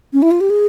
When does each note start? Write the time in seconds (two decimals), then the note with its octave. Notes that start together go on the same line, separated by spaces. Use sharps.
0.13 C#4
0.22 E4
0.31 F4
0.41 G4
0.50 G#4